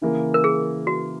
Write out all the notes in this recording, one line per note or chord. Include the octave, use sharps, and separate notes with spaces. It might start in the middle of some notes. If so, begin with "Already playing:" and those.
C#3 E3 A#3
A#4
G#4
F#4